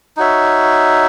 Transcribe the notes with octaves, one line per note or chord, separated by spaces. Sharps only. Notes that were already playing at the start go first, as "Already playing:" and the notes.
D#4 F#4 C#5 E5